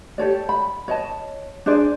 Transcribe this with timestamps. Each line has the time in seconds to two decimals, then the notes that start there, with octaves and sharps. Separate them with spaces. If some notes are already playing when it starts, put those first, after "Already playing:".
0.18 G4 A4 C#5 D5
0.49 B5
0.88 C#5 D#5 A5
1.66 D4 G#4 C5 D5